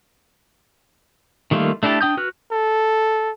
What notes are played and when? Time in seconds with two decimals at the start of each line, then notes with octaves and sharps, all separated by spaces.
1.51 D#3 G3 A3 A#3 F4
1.83 A3 D4 E4 G4 A4
2.01 D4 G5 D#6 G6
2.17 F#4 B4 F6 F#6
2.51 A4